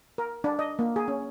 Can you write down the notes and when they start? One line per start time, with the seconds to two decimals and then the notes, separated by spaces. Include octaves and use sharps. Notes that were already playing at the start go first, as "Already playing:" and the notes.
0.18 A#4
0.44 D4
0.59 D#5
0.79 A#3
0.96 G#4
1.08 C#4